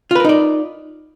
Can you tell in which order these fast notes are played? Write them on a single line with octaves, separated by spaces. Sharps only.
F4 B4 A#4 D#4 D5